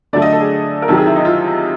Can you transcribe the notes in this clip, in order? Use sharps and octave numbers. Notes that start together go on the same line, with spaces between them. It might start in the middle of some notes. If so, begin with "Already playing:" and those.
D3 F#3 A3 D5
D#5
A4
G#4
A#4
C3 D#3 F#3 A4
G#4
E4
D#4
F4